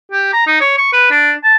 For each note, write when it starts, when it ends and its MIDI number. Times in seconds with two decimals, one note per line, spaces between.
0.12 0.29 67
0.33 0.42 82
0.47 0.59 63
0.61 0.76 73
0.78 0.90 85
0.93 1.07 71
1.11 1.33 62
1.44 1.56 81